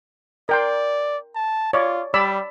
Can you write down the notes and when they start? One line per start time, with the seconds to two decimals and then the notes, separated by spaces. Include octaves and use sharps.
0.49 A#4 D5 G5 C6
1.35 A5
1.73 F4 C#5 D5
2.14 G3 D5 B5 E6